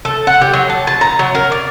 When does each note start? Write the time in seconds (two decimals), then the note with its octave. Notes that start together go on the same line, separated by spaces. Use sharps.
0.05 A4
0.27 F#5
0.41 G4
0.53 F#3
0.70 A5
0.87 A5
1.01 A#5
1.19 F#3
1.35 A#4
1.52 D5